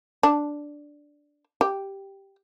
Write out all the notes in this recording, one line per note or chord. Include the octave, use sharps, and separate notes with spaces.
D4
G4